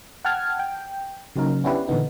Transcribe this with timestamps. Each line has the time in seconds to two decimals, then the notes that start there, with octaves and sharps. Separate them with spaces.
0.25 F#5 G5 A5 F6 G#6
0.59 G5
1.35 C#3 F#3 A#3 C#4 D#4 A#4
1.64 B3 C#4 D4 E4 G4 B4
1.87 A#2 D3 E3 B3 D#4